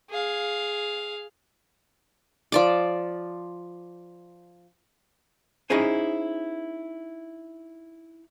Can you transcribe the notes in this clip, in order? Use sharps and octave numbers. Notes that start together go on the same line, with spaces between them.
G#4 F5
F3 D5 D6
C#4 D#4 E4 G#4 C5 G#5